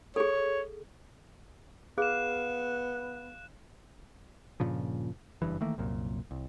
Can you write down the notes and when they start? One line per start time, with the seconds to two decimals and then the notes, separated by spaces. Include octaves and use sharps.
0.16 G#4 A4 C#5
1.98 B3 G#4 F5 F#6 E7
4.60 G2 A#2 C#3 F3
5.42 F#1 G2 E3
5.61 D#3 E3 A3 A#3
5.78 C2 F#2 A#2
6.31 C2